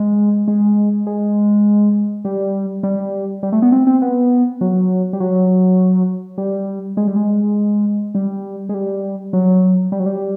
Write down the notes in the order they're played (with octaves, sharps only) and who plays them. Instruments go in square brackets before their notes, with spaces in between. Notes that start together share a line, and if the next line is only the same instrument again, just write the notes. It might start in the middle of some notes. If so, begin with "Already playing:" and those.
Already playing: [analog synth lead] G#3
G#3
G#3
G3
G3
G3
A3
B3
C4
C4
B3
F#3
G3
F#3
G3
G#3
G3
G#3
G3
G#3
G3
F#3
G3
F#3
G3